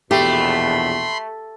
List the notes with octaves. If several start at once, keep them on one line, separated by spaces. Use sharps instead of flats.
A#1 E2 B2 A3 G4 B5 C6